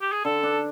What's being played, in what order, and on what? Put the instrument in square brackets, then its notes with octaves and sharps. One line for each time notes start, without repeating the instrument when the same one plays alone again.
[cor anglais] G4
G#4
[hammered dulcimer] D3 [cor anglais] A4
[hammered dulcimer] D4